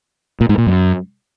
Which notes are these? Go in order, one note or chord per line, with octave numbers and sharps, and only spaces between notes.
A#2
G#2
A#2
F#2